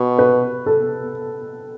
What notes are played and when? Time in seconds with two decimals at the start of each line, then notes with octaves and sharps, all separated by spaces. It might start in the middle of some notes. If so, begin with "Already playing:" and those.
Already playing: B2
0.19 B4
0.66 A4